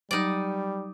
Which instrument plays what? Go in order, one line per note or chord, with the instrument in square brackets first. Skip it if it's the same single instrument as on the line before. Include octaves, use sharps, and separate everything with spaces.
[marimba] F#3 [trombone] G3 [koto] D#4 D5